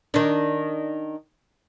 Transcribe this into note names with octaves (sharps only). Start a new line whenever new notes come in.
D#3 D4